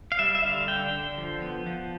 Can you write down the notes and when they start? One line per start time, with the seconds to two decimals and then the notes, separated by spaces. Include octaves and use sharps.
0.12 F5
0.19 G3 E5
0.35 E5
0.43 D3 F5
0.68 D3 G5
0.93 D3
1.18 F3
1.42 B3
1.66 F3